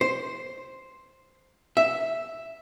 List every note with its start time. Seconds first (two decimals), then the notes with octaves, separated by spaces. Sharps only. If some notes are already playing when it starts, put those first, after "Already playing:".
0.01 C5
1.77 E5